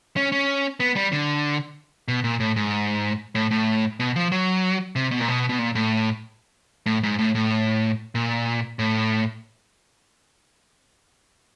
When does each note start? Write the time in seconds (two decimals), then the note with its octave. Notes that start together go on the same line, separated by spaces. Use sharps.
0.17 C#4
0.32 C#4
0.80 B3
0.96 G3
1.12 D3
2.08 B2
2.24 A#2
2.40 A2
2.56 G#2
3.35 A2
3.51 A2
4.00 B2
4.16 F3
4.32 F#3
4.96 C3
5.11 B2
5.19 A#2
5.28 B2
5.49 B2
5.59 A#2
5.75 A2
6.86 A2
7.03 G#2
7.19 A2
7.35 A2
8.15 A#2
8.79 A2